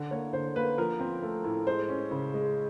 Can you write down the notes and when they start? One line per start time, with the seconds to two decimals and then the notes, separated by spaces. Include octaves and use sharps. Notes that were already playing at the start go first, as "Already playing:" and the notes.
Already playing: D3
0.11 A#3 C#5
0.33 D3 C5
0.55 A#3 B4
0.78 F3 A#4
1.00 C4
1.23 A3
1.44 A2
1.67 G#3 C5
1.89 C#4
2.11 C#3
2.34 G#3